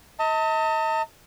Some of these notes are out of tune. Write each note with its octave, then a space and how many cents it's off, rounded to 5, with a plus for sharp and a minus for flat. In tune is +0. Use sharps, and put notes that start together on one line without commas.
D#5 +40 A5 +45